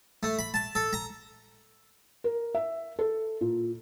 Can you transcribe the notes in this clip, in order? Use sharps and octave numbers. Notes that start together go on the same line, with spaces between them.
A3
B5
A5
A4
A#5
A#4
E5
A4
A#2